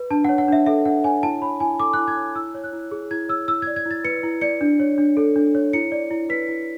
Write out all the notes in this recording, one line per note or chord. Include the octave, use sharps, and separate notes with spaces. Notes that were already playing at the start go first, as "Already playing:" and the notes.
Already playing: B4
D4 A5
C#5 F#5
F#5
D4 E5
A4 E5
D4 F#5
C#5 G#5
E4 A5
C#5 B5
E4 G#5
A4 D6
E4 F#6
G#6
C#5
E4 E6
C#5
F#6
E4
G#4
E4 G#6
C#5 E6
E4 E6
D5 G#6
G#6
E4
A6
B4 C#7
E4
D5 C#7
D4
C#5
D4
A4
D4
C#5
E4 C#7
D5
E4
B4 B6
E4